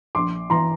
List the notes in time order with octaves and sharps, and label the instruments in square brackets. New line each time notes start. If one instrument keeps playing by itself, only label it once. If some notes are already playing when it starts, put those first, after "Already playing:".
[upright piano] A#1 C6 D6
E3 A#5 C6